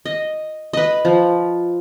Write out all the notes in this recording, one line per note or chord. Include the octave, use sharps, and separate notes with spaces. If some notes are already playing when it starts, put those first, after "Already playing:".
D#5
B4 D#5
F3